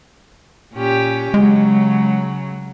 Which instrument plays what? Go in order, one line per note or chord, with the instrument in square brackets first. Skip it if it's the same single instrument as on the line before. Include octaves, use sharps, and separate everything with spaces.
[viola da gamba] A#2 C#4 G4
[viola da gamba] C#3 F#3 [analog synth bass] G#3